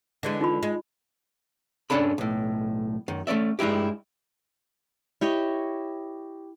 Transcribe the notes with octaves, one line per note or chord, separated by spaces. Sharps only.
D3 E3 G#3
D#4 F4 B5
G#3
G2 C3 C#4 D4 A4 B5
B1 A2
F#2 D#3
A3 C#4 D5 E5
G2 G#3 D#4 E4 G4
E4 G4 C#5 D#5